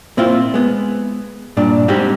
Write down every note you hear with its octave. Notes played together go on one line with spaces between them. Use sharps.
A#2 C4 E4 F4
G#3 B3
G2 A#2 D4 D5
G3 G#3 C4 D#4 F#4 G4